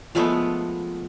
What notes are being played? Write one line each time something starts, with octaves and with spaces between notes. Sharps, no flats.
F3 G#3 A3 B3